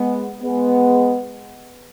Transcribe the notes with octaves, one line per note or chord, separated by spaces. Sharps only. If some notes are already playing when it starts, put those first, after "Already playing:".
Already playing: G#3 B3
G#3 B3